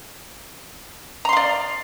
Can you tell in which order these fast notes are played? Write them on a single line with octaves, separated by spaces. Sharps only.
A#5 C6 F5 D5